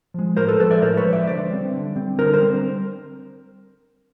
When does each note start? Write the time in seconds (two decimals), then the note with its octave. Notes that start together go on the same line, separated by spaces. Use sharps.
0.14 F3 G#3
0.37 A2 A#4 C5
0.48 A4 B4
0.59 F3 G#3 A4 B4
0.71 D5 E5
0.82 A2 A#4 C5
0.97 B4 C#5
1.05 F3 G#3
1.13 D5 E5
1.27 D3 C5 D5
1.50 G3 C4
1.74 D3
1.96 G3 C4
2.19 D3 A#4 C5
2.34 A#4 C5
2.42 G3 C4